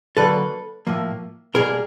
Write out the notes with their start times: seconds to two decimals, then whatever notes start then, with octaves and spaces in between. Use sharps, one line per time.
0.17 D3 F#3 A#3 A4 B4
0.87 A2 F3 A#3
1.54 B2 G3 A#3 G#4 A#4